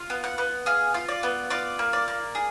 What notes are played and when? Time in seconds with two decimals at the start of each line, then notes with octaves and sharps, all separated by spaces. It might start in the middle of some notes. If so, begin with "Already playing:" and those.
Already playing: F4
0.10 B3
0.24 F#5
0.38 B3
0.66 G#4 F5
0.94 F4
1.08 D5
1.23 B3
1.50 F4 D5
1.79 A#3
1.93 D5
2.08 A#3
2.35 G#4